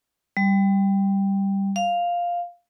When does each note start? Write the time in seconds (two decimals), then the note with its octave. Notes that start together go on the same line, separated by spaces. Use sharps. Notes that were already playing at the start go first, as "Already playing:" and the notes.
0.37 G3
1.76 F5